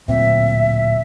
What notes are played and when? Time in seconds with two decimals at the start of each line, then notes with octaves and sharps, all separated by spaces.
0.08 D1 A#2 C4 E5